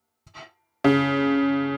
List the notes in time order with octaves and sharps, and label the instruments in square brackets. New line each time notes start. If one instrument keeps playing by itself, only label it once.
[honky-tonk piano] C#3